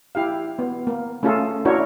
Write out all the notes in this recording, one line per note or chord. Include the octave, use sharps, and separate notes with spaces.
E4 G4 F5
B3
A#3
A3 C#4 F4 G#4 A4
D4 E4 F#4 A#4 C#5